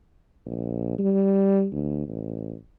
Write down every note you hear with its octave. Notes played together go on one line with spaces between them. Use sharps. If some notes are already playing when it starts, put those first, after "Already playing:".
A#1
G3
D2
A1